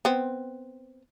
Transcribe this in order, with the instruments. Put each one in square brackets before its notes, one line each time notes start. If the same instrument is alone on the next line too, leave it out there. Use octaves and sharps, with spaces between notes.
[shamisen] B3 C4